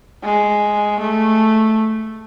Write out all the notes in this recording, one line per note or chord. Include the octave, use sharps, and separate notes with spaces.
G#3
A3